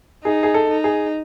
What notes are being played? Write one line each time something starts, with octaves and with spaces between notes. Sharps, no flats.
D#4 G#4
G#4
A4
D#4
G#4